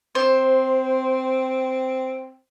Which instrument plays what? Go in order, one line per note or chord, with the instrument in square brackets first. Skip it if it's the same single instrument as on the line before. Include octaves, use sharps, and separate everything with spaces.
[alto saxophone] C4 [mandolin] C5